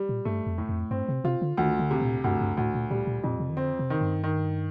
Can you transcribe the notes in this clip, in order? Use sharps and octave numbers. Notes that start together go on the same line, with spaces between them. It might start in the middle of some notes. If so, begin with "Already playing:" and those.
Already playing: G3
A#2
G2 A3
F2
A2
F2
G2 C4
C3
C3 F4
D3
D2 D#3
D3
C3
A#2
D2 G2
G2
D2 A2
A#2
A#2 G3
A#2
F2 A#2
C3
D#3
D3 C4
C3
D#3
G2
D#3